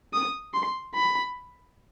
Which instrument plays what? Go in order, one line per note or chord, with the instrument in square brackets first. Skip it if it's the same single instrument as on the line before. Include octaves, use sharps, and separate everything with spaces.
[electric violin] D#6
C6
B5